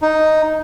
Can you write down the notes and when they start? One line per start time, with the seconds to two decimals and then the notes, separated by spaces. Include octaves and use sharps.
0.02 D#4